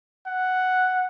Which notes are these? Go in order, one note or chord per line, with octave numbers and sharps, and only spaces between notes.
F#5